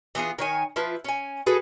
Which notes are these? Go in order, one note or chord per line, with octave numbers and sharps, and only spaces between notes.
E3 B3 F4 G#4
D#3 C#5 G#5
F3 E4 F4 B4
C#4 G#5
F#4 G#4 A4 B4